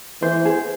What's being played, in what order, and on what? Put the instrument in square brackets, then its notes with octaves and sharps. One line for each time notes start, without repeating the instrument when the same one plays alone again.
[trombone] E3 [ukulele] C5
[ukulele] G#4